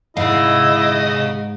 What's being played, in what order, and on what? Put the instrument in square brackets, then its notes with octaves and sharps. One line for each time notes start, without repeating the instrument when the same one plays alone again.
[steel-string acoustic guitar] G#2 [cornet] E4 [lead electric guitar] G#4 F5 [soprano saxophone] D#5